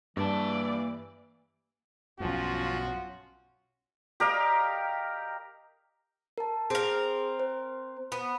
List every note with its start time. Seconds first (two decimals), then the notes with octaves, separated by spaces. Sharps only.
0.17 G2 E3 A#3 D5 A5
2.20 B1 G2 F3 C#4 F4 F#4
4.20 G4 A#4 D#5 F5
6.38 A#4 A5
6.70 C4 G#4 A#4
7.40 C5
8.12 B3